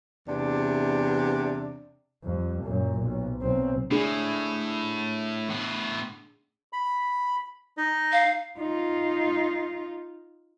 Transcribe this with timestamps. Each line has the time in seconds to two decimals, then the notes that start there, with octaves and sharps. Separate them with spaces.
0.28 E2 C3 D4
2.24 F2 G3
2.63 F#2 A#2
3.01 B1
3.41 B1 C4
3.91 A2 D4 G#4
5.50 A2 B3
6.73 B5
7.77 D#4 D#5
8.12 F5
8.59 D#4 F4